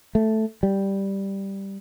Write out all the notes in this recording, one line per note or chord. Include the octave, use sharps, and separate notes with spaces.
A3
G3